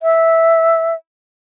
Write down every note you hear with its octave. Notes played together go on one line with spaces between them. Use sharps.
E5